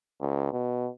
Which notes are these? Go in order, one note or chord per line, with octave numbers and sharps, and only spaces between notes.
C#2
B2